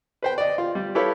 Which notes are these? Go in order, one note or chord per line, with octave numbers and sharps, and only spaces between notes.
B4 C5 G5
D5 D#5
F4
G3
E4 G4 A4 B4 C#5 F5